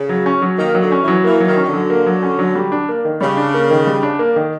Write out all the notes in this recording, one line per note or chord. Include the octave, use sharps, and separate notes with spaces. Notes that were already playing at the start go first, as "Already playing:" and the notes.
Already playing: C#3
F#3
C#4
F#3
D#3 A#3
F#3
D3
C#4
E3
F#3
E3 A#3
F#3
D#3
C#4
D#3
D3
F#3
A#3
F#3
C#4
F#3
G3
D4
A#3
D#3
C#3 G3
D4
A#3
D#3
G3
D4
A#3
D#3